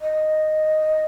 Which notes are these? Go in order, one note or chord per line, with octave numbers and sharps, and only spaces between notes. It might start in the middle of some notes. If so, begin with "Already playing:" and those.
D#5